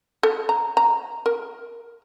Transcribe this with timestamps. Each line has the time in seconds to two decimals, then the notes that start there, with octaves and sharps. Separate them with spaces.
0.23 A4
0.49 A#5
0.77 A#5
1.26 A#4